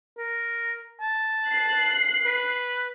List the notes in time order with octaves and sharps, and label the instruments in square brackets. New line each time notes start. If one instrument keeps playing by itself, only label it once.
[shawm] A#4
A5
[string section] F#6 C7
[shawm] B4